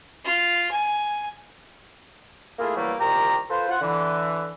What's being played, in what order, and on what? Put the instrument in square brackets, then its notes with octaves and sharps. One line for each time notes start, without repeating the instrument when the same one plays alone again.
[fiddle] F4
G#5
[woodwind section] A3 A#3 E4 F4 G#4
E3 F#3 G3 A3 A#3
C2 A#2 D#3 G4 A#5
F4 A4 B4 C5
F4 C5 F#5
D3 E3